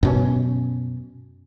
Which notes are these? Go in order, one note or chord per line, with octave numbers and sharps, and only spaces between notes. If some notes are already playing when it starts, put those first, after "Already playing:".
F#2 B2 C#4